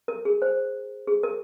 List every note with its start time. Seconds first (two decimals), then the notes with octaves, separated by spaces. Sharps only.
0.08 A#4
0.25 G#4
0.42 C5
1.07 G#4
1.23 A#4